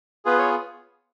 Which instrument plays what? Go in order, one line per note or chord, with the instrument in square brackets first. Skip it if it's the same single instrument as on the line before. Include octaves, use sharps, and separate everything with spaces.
[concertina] B3 F4 G#4 B4
C#5